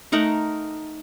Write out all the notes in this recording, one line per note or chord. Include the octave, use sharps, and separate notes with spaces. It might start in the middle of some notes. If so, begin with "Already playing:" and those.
A3 D#4 A#4 F#5